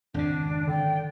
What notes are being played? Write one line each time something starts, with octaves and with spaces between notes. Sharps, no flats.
G#1 F2 C#3 D4
D3 D5 G5